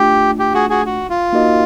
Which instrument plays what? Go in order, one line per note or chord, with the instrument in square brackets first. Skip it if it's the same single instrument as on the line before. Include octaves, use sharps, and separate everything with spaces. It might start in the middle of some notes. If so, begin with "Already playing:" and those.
Already playing: [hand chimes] A3 D4 F4 [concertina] G4
[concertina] G4
F#4 G#4
F#4 G#4
F#4
F4
[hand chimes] A#3 D#4 F#4 A#4 D#5